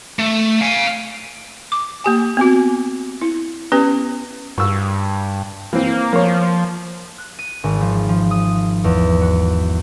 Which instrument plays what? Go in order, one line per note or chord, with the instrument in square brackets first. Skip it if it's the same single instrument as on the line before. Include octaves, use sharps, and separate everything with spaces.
[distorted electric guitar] A3
F5 G#5
[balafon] D6
A#3 G4 G#5
B3 C4 F#4
E4
B3 C#4 G4 B4
[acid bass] G2 [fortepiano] C#6 E6
[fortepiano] E3 C4 [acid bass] A#3
[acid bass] F3 [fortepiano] A#3 C#5
[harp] F#6
D#7
G#1
F3
F3
D#6
E2
F#4